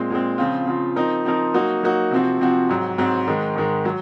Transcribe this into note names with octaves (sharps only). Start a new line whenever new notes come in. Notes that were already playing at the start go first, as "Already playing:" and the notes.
Already playing: A#2 G#3 C4
A#2 G#3 C4
C#3 F3 C4 F4
C#3 F3 C4 F4
F3 C4 D#4 A#4
F3 C4 D#4 A#4
F#3 A#3 D#4 F#4
F#3 A#3 D#4 F#4
C3 F3 C4 F#4
C3 F3 C4 F#4
G#2 F#3 C4
G#2 F#3 C4
G#2 D#3 G#3
G#2 D#3 G#3
F#3